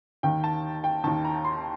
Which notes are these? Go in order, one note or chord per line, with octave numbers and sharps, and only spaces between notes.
D#2 D#3 G5
A5
G5
D#2 D#3 A5
A#5
C6